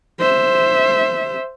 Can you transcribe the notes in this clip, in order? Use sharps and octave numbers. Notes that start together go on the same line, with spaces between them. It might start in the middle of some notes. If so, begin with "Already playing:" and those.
C5 E5